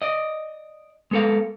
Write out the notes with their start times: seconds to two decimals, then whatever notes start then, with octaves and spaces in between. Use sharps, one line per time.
0.02 D5 D#5
1.11 G#3 B3 A4 A#4 F5